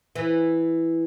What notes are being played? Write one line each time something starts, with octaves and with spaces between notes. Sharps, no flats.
E3